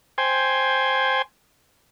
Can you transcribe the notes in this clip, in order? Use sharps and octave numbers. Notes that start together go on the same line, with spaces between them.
C5 G5 G#5